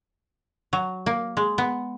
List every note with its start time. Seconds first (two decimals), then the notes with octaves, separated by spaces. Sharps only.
0.73 F#3
1.06 A#3
1.37 G#3
1.58 B3